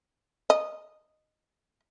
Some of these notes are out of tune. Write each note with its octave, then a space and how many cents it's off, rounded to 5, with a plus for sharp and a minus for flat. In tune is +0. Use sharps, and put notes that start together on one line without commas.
D#5 -10